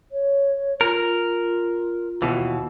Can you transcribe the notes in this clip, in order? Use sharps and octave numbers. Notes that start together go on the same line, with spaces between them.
C#5
F4 A#4
D#2 B2 E3